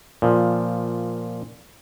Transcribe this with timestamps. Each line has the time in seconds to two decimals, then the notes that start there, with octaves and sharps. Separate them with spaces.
0.22 A#2 F3